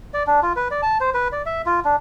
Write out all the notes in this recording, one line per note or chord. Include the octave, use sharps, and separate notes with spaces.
D5
D4
F4
B4
D5
A5
C5
B4
D5
E5
F4
D4